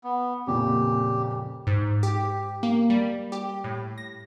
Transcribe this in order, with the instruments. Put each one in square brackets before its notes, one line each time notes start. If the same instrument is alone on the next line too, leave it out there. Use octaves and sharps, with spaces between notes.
[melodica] B3
[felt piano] F2 A#2 C#3 [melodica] G4
[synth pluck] G#2
G4
A#3
G3
G4
A2
A#6